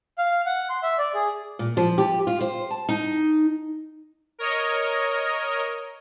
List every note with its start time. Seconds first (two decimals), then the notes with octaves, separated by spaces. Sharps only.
0.18 F5
0.46 F#5
0.69 C6
0.83 E5
0.98 D5
1.15 G#4
1.59 A#2
1.77 F3
1.98 G4
2.27 F4
2.41 C5
2.70 A5
2.89 D#4
4.39 A#4 C#5 D#5